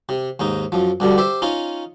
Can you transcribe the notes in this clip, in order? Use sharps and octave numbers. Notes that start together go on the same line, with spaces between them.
C3
D#2 G#2 D#4
F#2 F3
G2 B2 D3 G3
G4 C5 E5
C#4 D#4 F4